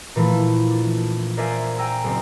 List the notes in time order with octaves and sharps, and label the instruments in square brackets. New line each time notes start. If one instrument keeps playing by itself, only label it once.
[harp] A#2 E3 F3 A3
D4
A#4 C5 D5 E5 F5 G#5
G5 G#5 A#5 E6
F#1 C4